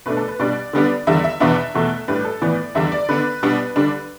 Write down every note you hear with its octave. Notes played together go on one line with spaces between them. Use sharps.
B2 A3 D4 B4
A4
B4
B2 G3 D4 D5
D3 G3 B3 D4
E2 D3 G3 E5
E5
E2 B2 B3 D4 E5
E2 B2 A3
A2 G3 D4 B4
A4
A2 E3 B3 D5
E2 D3 G3 D4 E5
D5
D3 B3 D4 B4
B2 G3 B3 D4
D3 G3 D4